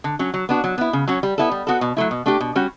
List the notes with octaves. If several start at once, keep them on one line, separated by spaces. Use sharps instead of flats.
D3
F#3 C#4
F#3
B3 D4 F#4
F#3
B3 E4
C#3
F#3 C#4 F#4
G3
B3 E4 A4
G3
B3 F#4 A4
B2
F#3 A3 E4
B2
A3 D4 G4
B2
G3 C#4 F#4